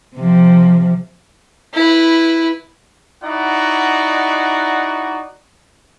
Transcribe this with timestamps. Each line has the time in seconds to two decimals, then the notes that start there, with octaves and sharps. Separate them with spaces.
0.16 C3 F3
1.74 E4 B4
3.23 D#4 E4 F#4 D5 F#5